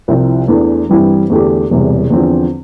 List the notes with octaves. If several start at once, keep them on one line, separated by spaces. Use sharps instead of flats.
C2 C3 F3 C4 E4
E2 E3 A3 D4
G2 E3 G3 C4 E4
E2 D3 A3 D4 G4
E1 E2 C3 G3
E2 D3 F3 C4